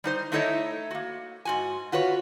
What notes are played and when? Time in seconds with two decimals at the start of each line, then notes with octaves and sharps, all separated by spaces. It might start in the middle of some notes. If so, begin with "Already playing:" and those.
0.04 G3 D#4 C5
0.32 A3 D#4 E4 A4 C#5 D#5
0.91 A#3 F#4
1.45 G#2 F#4 G#5
1.92 F4 F#4 B4 C#5